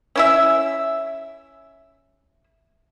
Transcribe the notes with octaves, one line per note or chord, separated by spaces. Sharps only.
C#4 E4 E5